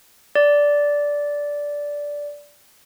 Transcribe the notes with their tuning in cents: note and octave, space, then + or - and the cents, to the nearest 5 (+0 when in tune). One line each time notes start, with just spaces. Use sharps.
D5 -10